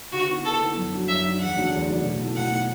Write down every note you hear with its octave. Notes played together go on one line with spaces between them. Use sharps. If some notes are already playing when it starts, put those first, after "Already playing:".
D3 F#4
B3 E4
D3 A4
B3 E4
F#2
F#3 D4
F#2 E5
F#3 D4
E2 F#5
D3 F#3 A3 D4
E2
D3 F#3 A3 D4
B2
A3 E4
B2 F#5
A3 E4